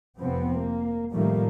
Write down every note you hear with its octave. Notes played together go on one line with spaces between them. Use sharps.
F1 C3 F3 B3 C4
A#3
A2 D#3 F3 G3 A3 A#3